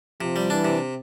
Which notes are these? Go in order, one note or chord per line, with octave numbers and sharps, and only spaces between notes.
C3 F3
G3
E3 D4
C3